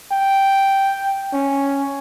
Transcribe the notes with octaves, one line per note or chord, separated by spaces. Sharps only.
G5
C#4